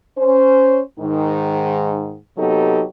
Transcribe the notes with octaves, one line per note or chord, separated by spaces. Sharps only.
C#4 C5
G#2 D#3 D#4
C3 F#3 B3 D#4 G4 A4